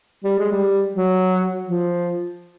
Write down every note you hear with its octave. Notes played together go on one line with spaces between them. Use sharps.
G3
G#3
G3
F#3
F3